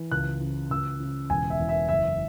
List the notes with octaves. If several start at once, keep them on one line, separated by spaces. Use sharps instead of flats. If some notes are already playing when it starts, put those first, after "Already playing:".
Already playing: E3
C#2 F#6
C#3
C#2 E6
C#3
E1 G#5
E5
E2
E5
F#1 E5